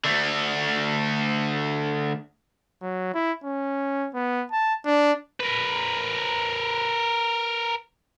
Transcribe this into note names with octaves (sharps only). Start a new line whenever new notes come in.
D3 A3
F#3
E4
C#4
B3
A5
D4
A#4 B4